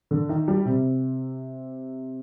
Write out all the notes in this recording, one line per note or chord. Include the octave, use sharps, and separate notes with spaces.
D3
D#3
G3
C3